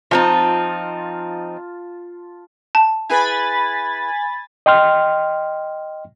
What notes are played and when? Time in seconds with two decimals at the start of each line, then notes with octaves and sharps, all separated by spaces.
0.11 F3 C4 D#4 F4 A5
2.75 A5
3.09 E4 G#4 B4 G#5 B5 A6
4.66 D#5 G5 C6 F6